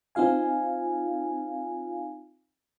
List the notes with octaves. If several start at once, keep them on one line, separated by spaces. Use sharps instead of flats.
C4 D#4 F4 F5 G#5